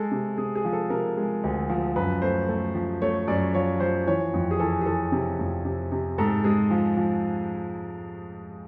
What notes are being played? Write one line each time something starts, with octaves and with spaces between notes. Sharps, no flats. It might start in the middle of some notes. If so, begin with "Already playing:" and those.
Already playing: G#3 A4
C3
C3 G#4
G#4
F3
A4
C3 A#4
G#3
D2
F3
F#2 B4
A3 C5
A3
F3
A3 C#5
F#2 D5
F3 C#5
F3 C5
E3 C#5
F2
G#4
E3 A4
G#4
E3 A4
C3
F2
C3
C3
G#2 A4
G#3 G#4
F3
F3